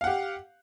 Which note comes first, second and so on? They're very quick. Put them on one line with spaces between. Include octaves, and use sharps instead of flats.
F5 F#5 G4